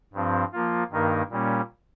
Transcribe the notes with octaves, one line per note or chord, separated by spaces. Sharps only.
G2 F3 C4
F3 A#3 F4
G2 D#3 A#3 D#4 A#4
A#2 G3 A#3 C#4